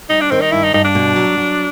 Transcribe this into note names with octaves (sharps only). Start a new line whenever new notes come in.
G3 D#4
D4
D#3 C4
D#4
G2 E4
D#4
G2 D#4
D4
B2
F#3
F#3